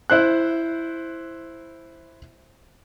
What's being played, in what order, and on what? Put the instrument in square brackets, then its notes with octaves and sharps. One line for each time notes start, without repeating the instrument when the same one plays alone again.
[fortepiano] E4 C5 F#6